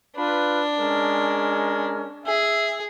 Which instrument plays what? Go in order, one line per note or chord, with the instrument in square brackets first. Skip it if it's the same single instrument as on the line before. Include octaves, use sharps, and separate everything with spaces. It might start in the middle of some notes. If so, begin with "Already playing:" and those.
[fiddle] D4 [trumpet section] F4 B4
[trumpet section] G#3 C#4 A#4
[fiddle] G#4 [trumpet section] E5